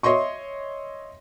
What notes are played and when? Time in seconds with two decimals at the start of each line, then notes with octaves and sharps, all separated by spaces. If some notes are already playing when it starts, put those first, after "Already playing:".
0.03 C#5 D#5 E5 C6 C#6